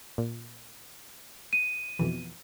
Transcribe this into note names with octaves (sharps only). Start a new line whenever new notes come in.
A#2
D#7
F2 B2 E3